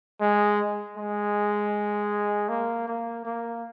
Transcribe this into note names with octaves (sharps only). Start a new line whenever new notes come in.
G#3
G#3
A#3
A#3
A#3